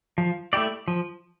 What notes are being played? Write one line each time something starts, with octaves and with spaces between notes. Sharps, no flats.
F3
A3 E4 G4 D5
F3